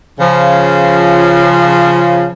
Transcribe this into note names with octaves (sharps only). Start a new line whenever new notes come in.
C#3 F3